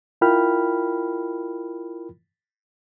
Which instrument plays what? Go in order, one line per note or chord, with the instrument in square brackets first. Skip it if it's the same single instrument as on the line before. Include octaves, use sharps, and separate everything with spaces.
[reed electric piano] E4 F4 A#4 G5 B5 F6